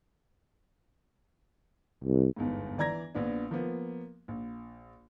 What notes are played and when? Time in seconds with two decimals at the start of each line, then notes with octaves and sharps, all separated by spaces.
2.04 C2
2.36 G1 E2 G#2
2.78 E3 D5 A#5 G#6 A#6
3.15 A#1 B3 D4
3.51 F3 A#3 B3
4.28 A#1